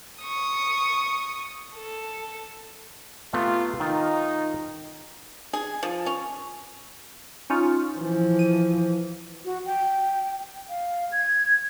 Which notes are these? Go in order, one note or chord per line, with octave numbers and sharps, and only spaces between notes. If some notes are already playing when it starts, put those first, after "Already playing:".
C#6 D#6
A4
C3 A3 B3 F4
D#3 D#4 F4
G#4
F3
C#4
C#4 D#4 F4
E3 F3
D#7
F#4
G5
F5
G#6